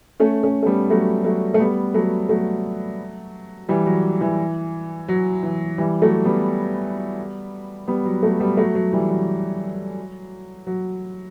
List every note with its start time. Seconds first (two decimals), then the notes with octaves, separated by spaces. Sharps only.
0.20 A3 C#4
0.43 A3 C#4
0.63 A3
0.66 G3 B3
0.90 F#3 A3
1.24 F#3 A3
1.54 A3
1.59 G3 B3
1.94 F#3 A3
2.29 F#3 A3
3.69 E3 G3
3.86 F#3
4.21 E3
5.08 F#3
5.43 E3
5.78 E3 G3
6.02 F#3 A3
6.24 G3 B3
7.88 G3 B3
8.05 F#3
8.22 F#3 A3
8.40 G3 B3
8.57 F#3 A3
8.75 F#3
8.93 E3 G3
9.10 F#3
10.67 F#3